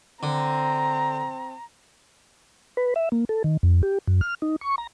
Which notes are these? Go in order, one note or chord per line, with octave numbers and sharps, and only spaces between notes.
D3 C4 A#5
B4
E5
A#3
A4
D#3
F2
G4
F#2
F6
D#4
C#6
A#5